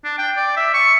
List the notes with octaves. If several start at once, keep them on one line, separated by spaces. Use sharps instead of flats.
D4
G5
D5
E5
C#6